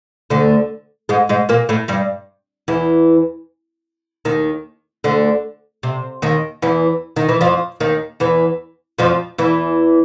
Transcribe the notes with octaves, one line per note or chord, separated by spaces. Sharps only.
D2 D3
G#2 G#3
G#2 G#3
A#2 A#3
A2 A3
G2 G3
E2 E3
D#2 D#3
D2 D3
C3
D#2 D#3
E2 E3
D#3
E3
F2 F3
D#2 D#3
E2 E3
F2 F3
E2 E3